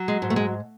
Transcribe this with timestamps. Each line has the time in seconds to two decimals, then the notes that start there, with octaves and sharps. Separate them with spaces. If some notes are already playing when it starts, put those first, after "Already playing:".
Already playing: F#3
0.08 G#3
0.22 G#2
0.30 A3
0.36 G#3